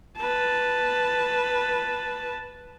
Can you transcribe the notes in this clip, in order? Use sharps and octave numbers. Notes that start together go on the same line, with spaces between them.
B4 A5